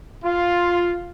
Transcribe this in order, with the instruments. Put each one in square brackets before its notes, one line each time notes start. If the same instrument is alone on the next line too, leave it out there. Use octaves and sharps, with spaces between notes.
[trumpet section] F4